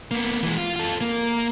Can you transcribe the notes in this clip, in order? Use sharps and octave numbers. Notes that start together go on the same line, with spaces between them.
A#3 B3
E3 G#3
F4
F4 A4
A#3